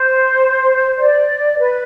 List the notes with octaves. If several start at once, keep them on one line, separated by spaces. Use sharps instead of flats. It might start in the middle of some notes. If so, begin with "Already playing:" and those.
Already playing: C5
D5
B4